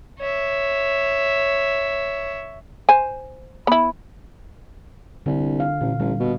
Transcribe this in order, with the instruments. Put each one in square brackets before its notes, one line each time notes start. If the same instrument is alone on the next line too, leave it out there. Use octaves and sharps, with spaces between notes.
[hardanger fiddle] C#5 E5
[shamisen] C5 G#5
B3 E4
[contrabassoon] C2 [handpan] D3
[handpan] F5
[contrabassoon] A1 [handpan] A#2
[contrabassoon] A1 [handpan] G3
[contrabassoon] B2